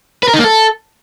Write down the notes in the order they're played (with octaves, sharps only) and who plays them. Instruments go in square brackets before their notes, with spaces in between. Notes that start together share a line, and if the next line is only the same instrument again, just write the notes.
[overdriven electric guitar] B4
A#4
D#4
A#3
A4